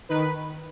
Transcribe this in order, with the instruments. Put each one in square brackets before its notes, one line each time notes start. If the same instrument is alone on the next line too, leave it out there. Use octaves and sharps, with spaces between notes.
[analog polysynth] D#3 B4